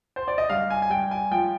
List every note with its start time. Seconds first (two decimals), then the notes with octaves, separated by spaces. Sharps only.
0.16 C5
0.28 D5
0.38 D#5
0.49 G2 F5
0.70 G#5
0.82 G#5
0.90 G2 G5
1.11 G#5
1.31 F3 G5